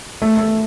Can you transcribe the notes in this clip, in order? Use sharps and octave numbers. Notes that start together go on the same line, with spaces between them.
A3
A3